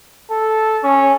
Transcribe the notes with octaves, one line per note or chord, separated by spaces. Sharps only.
A4
C#4